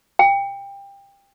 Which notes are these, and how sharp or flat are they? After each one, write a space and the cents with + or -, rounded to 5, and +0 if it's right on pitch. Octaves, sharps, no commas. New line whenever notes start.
G5 +25